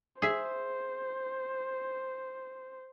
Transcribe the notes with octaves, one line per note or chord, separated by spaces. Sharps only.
G#4 C5 E5